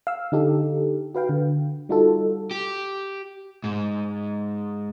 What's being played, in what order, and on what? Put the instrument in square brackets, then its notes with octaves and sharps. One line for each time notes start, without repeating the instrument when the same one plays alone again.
[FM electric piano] F5 E6
D3 D#4 G4 A4
F#4 B4 F5 G5
D3
G3 D#4 F4 F#4 A4
[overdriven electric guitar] G4
G#2